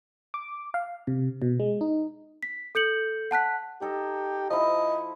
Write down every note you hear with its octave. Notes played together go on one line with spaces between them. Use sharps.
D6
F5
C3
B2
G#3
D#4
B6
A4 G6 C#7 F#7
F#5 A5 F#6 B6
D#4 G4 A4 D#5
F3 E4 D#5